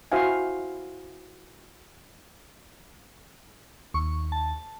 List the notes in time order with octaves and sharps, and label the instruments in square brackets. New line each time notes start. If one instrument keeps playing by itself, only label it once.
[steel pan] E4 F#4 C5 E5 F5 G#5
[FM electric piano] D#2 [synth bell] C#6
[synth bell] A5